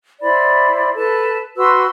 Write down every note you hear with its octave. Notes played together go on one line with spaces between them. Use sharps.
E4 C5 D5 B5
A4 B4 A5
F#4 B4 C6 E6